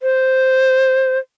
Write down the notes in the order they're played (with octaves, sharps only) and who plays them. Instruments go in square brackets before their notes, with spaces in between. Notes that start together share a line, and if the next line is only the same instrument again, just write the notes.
[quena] C5